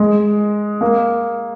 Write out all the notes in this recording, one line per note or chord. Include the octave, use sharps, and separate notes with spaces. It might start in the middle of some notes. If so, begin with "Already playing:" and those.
Already playing: G#3
A#3